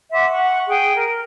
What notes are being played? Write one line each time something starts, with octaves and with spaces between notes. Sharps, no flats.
E5 F#5 C6 D6
F#5 C#6
G#4 G5
A#4